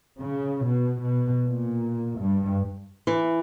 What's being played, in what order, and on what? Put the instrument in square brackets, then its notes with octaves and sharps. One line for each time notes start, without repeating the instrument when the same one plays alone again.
[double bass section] C#3
B2
B2
A#2
G2
[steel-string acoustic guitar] E3